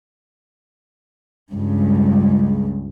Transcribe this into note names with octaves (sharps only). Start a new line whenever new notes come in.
C#2 G2